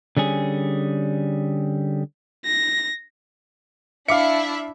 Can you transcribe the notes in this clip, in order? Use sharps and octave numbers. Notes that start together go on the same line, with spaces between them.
D3 G3 C#4 G#4
A#6
D4 E4 E5 F5 D6 C#7